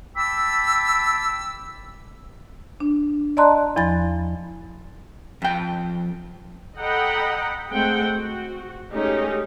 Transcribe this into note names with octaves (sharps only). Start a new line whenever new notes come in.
G5 A5 B5 D6 E6
D4
D5 D#5 A5 A#5 C6 F#6
E2 F3 B5 A6
F2 G5
A4 D#5 F#5 G5 A#5 B5
G#3 A3 C4 F#5 G5
F#4
G#3 A3 C#4 D#4 G4 G#4